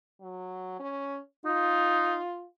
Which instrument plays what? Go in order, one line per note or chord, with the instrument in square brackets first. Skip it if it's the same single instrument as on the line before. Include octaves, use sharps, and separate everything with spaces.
[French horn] F#3
C#4
[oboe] D#4 [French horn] F4